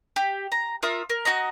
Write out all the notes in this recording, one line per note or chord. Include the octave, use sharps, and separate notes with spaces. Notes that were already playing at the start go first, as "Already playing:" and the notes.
G4
A#5
F4 A#4 E5 D#6
A#4
D#4 F#4 D#5 A#5